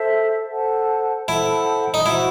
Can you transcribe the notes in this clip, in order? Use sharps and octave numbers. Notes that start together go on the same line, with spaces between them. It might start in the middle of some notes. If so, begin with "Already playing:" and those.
Already playing: A4 C5 E5
A4 C5 F#5 A5
E4 A4 C5 F#5 A5
D#4
E4 F#4 C5 F#5